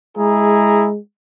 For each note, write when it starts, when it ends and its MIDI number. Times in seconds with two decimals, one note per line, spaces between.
0.17 0.98 56
0.17 0.88 64
0.17 0.88 68
0.17 0.88 82